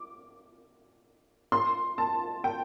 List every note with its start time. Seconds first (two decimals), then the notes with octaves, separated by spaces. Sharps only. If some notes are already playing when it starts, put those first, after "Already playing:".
Already playing: D6
1.52 C6
1.98 A5
2.44 G5